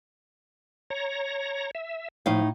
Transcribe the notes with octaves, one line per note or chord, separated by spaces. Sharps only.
C#5 A#5
E5
A2 F3 D#4 F5